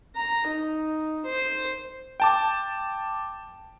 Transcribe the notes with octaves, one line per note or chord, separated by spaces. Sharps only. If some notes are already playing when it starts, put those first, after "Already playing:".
A#5
D#4
C5
G5 A5 D6